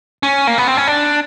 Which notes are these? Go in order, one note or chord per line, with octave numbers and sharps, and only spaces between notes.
C#4
A#3
B3
C4
C#4
D4